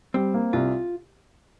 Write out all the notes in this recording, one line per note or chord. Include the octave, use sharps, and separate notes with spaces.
G3 C4
A#3
C2 F4